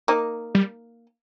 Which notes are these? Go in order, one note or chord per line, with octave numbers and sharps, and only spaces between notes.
A#3 D#4
G3